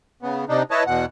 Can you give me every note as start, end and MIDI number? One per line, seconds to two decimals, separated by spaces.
0.22 0.45 49
0.22 0.45 59
0.49 0.62 48
0.49 0.62 62
0.49 0.62 63
0.71 0.84 64
0.71 0.84 71
0.71 0.84 73
0.71 0.84 75
0.71 0.84 81
0.87 1.05 40
0.87 1.05 47
0.87 1.05 78